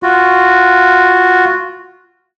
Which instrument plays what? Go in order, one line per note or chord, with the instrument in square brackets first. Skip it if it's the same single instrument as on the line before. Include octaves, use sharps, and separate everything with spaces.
[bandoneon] F4 F#4